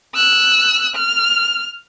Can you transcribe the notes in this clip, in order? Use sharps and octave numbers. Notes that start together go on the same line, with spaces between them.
E6 F#6
F6